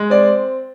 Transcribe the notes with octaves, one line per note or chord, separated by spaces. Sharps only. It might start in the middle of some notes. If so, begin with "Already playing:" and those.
Already playing: G#3
C4 D5